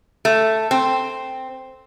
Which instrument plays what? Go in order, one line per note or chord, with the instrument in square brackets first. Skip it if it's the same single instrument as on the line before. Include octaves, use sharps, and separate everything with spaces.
[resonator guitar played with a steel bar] A3
C4